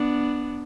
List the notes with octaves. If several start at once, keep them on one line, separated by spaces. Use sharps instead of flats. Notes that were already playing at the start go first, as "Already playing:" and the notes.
Already playing: B3 D4